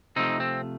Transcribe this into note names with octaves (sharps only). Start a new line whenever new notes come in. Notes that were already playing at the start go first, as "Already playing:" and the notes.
C3 F3 A3 C4 D#4
C4